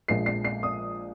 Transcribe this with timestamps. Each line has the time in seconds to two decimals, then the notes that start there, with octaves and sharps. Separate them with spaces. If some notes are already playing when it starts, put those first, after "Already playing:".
0.08 A#1 A#2 F3 G#3 C7
0.26 C7
0.45 C7
0.63 D#6